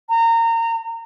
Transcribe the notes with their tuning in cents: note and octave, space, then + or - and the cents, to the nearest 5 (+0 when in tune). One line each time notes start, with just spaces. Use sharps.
A#5 -25